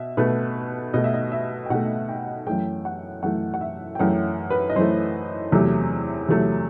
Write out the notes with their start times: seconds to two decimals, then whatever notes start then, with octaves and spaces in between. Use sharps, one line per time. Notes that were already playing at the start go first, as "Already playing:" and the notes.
Already playing: B2 E5
0.17 B2 A3 B4
0.94 B2 A3 D#5
1.04 E5
1.14 D#5
1.32 E5
1.66 G5
1.70 B2 A3 F#5
2.09 G5
2.47 F#2 E3 A3 G5
2.85 F#5
3.23 F#2 E3 A3 F#5
3.54 F#5
3.61 E5
3.95 G5
3.99 F#2 E3 A3 F#5
4.50 B4
4.70 D#5
4.75 F#2 E3 A3 C5
5.52 E2 C3 F#3 A3
6.29 E2 C3 F#3 A3